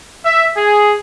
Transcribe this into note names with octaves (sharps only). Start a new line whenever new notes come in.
E5
G#4